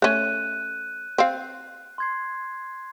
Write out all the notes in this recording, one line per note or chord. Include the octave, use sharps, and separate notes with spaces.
A3 C#4 F#6 D#7
C4 F5
C6 G#6 C7